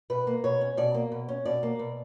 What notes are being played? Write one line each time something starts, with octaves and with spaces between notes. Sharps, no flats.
B2 B4
A#3
B2 C#5
C#4
B2 D5
A#3
B2
C#4
B2 D5
A#3
B2